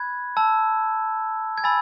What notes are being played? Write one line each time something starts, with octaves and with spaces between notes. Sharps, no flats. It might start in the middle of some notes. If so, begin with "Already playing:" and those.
Already playing: B5 F#6 G#6
A5 E6
G#6
G#5 B5 E6 A6